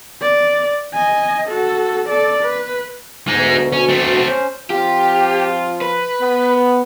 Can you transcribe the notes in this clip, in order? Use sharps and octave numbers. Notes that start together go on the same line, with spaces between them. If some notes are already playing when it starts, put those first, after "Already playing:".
D5
D#5 G#5
F#4 A4
A4 D5
B4
D2 B2 G#3 D#4
C#4
A3 C4
C#4 C5
F3 C4 F4 G4
B4
B3